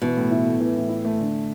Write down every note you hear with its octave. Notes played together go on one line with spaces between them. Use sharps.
B2 E3
A2
E4
A3
E3
A2
E4
A3
D3